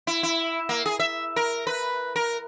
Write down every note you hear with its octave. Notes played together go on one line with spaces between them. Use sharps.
E4
E4
A#3
G#4
E5
A#4
B4
A#4